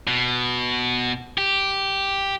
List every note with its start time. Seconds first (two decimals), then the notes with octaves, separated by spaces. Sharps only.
0.07 B2
1.38 G4